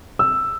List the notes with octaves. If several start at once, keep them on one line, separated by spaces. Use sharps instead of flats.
E6